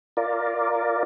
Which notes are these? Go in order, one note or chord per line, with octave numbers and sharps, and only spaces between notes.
F4 A#4 D5